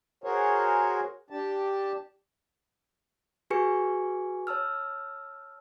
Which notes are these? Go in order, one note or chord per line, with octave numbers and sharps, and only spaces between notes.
F#4 G#4 A#4 C5 C#5
D4 G4 A5
F#4 G#4 B4 G#5 C#6 C#7
C#5 A5 E6 F6